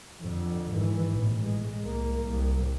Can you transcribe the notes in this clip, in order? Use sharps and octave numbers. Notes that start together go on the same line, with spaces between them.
F2 D3
G#1 E3
A1 B2
G#3
C2 A#3
C2